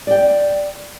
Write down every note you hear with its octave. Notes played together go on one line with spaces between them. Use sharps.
D5 G5